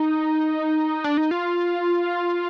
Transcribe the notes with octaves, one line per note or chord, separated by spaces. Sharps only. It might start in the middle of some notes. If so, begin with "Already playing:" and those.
Already playing: D#4
D4
D#4
F4